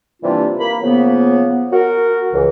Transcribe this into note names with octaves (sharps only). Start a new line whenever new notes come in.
C3 E3 G3 A#3 D4 F4
A#3 B5
C#3 F3 F#3 A#3 B3
F#4 A#4
C#2 E3